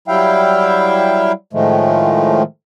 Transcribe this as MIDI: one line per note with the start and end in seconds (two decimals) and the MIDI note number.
0.08 1.32 54
0.08 1.32 55
0.08 1.32 64
0.08 1.32 76
0.08 1.32 77
0.08 1.32 79
1.53 2.43 45
1.53 2.43 51
1.53 2.43 53
1.53 2.43 56
1.53 2.43 57